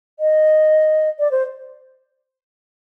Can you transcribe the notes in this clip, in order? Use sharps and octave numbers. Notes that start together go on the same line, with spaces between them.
D#5
D5
C5